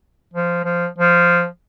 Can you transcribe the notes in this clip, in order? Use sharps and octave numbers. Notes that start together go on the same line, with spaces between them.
F3
F3
F3